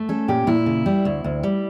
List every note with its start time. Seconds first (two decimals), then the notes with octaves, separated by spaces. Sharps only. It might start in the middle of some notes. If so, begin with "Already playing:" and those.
Already playing: A3
0.09 C#4 A4
0.28 A#2 G4
0.47 A#2 E4
0.66 C#3
0.86 G3
1.05 D2
1.24 D2
1.43 G3